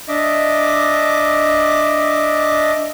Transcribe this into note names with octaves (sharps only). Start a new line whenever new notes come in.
D4 D#5 E5 D6